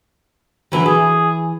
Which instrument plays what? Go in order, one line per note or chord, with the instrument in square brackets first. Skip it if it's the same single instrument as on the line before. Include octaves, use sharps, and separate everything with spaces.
[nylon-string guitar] D3 E3 F#3
[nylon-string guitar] E3 [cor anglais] G#4